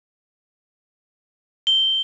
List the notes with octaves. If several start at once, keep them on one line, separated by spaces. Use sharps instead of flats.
G7